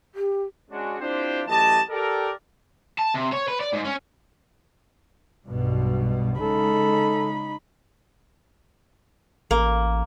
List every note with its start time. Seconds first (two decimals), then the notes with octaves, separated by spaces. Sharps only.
0.15 G4
0.70 G#3 C#4 D4 F#4
1.00 C4 D4 E4 F4 G4 C5
1.47 F#2 E3 A3 G4 D#5 A5
1.90 G4 A4 A#4 D5
2.99 A5
3.15 C3
3.33 C#5
3.48 B4
3.60 D5
3.73 G#2
3.84 C#4
5.48 B1 G2 B2
6.41 C#3 G#3 D#4 A4 B5
9.51 A1 A#3